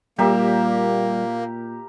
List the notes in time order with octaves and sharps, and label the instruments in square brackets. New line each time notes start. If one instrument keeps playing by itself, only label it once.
[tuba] A#2 [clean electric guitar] G3 [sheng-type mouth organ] A#3 [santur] G4 A#4 E5